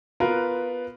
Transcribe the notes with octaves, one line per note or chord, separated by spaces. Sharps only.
B3 F4 A#4 B4